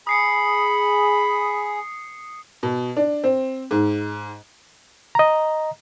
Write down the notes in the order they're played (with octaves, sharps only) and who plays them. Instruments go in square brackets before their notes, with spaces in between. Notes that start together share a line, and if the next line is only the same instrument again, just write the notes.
[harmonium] G#4 [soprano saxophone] B5 [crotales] D#6 C7 C#7
[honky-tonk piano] B2
D4
C4
G#2
[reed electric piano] D#5 A#5